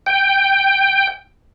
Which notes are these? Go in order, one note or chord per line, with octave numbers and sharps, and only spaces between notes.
G5